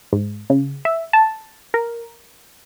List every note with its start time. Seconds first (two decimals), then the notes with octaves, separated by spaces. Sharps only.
0.13 G#2
0.50 C#3
0.85 E5
1.13 A5
1.74 A#4